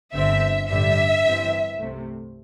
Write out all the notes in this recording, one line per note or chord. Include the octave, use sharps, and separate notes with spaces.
G1 G2 D3 C4 E5
A1 G2 D3 G3 E5
G2 E3 C4
C2 C3 A3